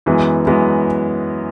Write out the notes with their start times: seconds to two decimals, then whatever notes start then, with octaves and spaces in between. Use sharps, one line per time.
0.06 F#2 E3 G#3 B3
0.46 F#2 E3 G#3 B3